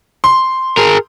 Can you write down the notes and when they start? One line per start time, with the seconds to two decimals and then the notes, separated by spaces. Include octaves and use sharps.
0.24 C6
0.77 G#4 A#4